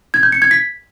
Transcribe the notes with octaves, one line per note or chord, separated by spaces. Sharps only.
G#6
G6
C#7
G#6
B6